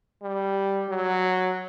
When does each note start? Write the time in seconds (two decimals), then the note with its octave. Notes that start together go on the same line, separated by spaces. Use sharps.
0.22 G3
0.89 F#3